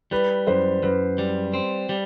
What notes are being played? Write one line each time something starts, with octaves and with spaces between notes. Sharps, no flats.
G3 B4
F#2 C5
F#2 B4
G3
C4
G3